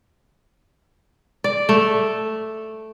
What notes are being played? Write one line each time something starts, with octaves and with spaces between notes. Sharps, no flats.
D5
A3